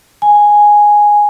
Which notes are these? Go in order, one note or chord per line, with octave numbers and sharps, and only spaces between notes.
G#5